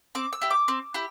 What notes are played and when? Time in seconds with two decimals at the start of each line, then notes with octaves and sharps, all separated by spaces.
0.15 C4 D6
0.33 E6
0.41 E4 G4
0.50 D6
0.68 C4
0.94 E4 G4